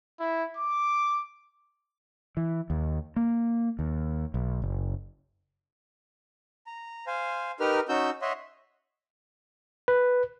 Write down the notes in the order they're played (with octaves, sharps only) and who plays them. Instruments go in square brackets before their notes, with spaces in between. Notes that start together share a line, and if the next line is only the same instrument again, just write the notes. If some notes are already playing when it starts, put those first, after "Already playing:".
[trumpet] E4
D6
[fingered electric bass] E3
D#2
A#3
D#2
B1
F#1
[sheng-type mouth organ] A#5
C5 F5 G#5
D#4 G4 A#4 B4 F6
C#4 D#4 F#4 E6 G6
C#5 D#5 E5 F#5 C6
[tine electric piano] B4